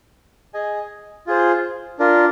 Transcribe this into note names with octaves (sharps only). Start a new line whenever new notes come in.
G#4 D#5 G#5
F4 G#4 C5
D4 F4 A#4